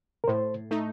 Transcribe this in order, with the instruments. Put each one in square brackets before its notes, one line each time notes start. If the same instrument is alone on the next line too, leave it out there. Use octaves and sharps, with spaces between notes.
[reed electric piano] A#4
[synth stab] A2 [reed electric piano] C5
[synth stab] A3 D#4